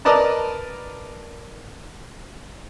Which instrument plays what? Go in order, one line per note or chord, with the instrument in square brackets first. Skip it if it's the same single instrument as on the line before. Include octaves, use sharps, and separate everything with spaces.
[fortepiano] A#4 B4 D5 D#5 A5 A#5